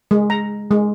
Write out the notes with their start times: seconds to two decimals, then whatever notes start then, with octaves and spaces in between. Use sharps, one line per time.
0.11 G#3
0.30 A#5
0.71 G#3